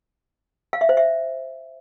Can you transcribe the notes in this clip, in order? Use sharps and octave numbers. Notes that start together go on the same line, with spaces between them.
F5
E5
C5
E5